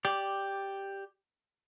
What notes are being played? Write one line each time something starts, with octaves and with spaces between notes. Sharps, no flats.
G4 D5